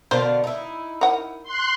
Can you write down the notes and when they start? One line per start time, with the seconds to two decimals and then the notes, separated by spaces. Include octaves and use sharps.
0.11 B2 D3 A#4 C5 F5
0.44 D#4 E4
1.01 A#4 F#5
1.43 C6 F#6